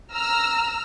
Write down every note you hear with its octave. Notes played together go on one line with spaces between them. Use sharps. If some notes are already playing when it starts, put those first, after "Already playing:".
A#5 E6 F6